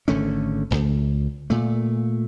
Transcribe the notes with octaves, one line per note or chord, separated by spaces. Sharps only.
G#1 D3 A3 C#4
D1 C#2
A#2 A3